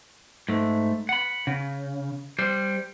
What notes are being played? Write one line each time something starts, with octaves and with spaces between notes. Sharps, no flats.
G#2 A3
F#5 B5
C#3
G3 C5